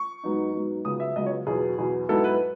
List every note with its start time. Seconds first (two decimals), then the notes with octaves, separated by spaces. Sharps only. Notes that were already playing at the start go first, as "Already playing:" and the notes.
Already playing: C#6
0.24 G#2 F#3 B3 D#4
0.53 G#2 F#3 B3 D#4
0.85 C#2 C#3 F#3 B3 D#6
1.00 E5
1.16 C#2 C#3 F#3 B3 D#5
1.26 C#5
1.47 E2 B2 F#3 G#4
1.78 E2 B2 F#3
2.09 G#2 F#3 B3 E4 A4
2.24 B4